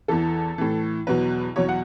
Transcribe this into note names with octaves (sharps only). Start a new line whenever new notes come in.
E2 E3 A4
A2 E3
E2 B2 F#3 B4
E2 B2 F#3 C#5
F#5